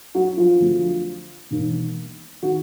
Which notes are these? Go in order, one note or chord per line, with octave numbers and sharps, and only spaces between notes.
F#3 F#4
F3 F4
F2 D3 F#3 A3
E1 D#2 D#3
D#3 F#4